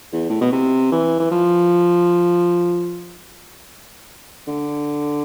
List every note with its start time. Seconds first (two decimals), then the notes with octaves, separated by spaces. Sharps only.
0.13 E2
0.30 A2
0.41 B2
0.52 C3
0.91 E3
1.20 E3
1.31 F3
4.47 D3